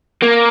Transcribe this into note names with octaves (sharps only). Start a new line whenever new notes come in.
A#3